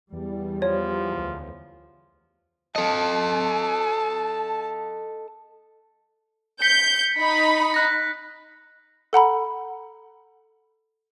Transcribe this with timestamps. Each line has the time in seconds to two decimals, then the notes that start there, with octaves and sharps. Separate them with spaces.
0.13 E2 G3
0.62 F3 C#5
1.16 D2
2.76 A4 D#5 A5
6.62 G6 B6 C#7
7.19 D#4 B5
7.74 F#6 A#6
9.13 A4 F#5 A#5 B5